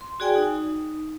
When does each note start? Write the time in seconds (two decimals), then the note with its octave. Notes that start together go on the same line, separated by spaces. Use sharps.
0.01 C6
0.20 F#4 G#4 D5 G5 G#5
0.35 D#4